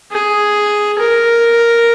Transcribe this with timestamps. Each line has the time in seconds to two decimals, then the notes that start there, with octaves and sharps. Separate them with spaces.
0.12 G#4
0.99 A#4